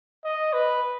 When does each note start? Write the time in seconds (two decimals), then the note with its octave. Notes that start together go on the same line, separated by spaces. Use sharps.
0.24 D#5
0.53 B4